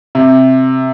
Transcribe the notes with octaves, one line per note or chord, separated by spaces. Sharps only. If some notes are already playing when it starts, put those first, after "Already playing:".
C3